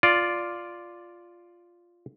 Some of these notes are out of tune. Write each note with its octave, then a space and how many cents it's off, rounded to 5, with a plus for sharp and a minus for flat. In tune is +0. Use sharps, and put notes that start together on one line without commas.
F4 +0 D5 +0